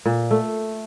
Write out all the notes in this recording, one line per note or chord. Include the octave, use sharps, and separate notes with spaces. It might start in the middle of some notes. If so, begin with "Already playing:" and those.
A#2
A3